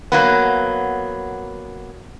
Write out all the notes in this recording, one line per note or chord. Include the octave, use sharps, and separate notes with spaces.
F#3 A#3 B3